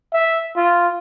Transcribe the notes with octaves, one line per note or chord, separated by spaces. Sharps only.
E5
F4